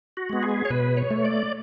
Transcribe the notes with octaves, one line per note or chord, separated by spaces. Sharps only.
F#4
G#3 B3
G#4
C#5
B2 B4
C#5
A3
D5